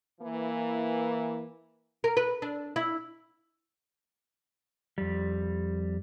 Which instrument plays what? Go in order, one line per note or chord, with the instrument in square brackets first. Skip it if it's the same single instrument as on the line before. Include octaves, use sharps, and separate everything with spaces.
[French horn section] E3 A#3
[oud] A#4
B4
D4
E4
[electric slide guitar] F2 G3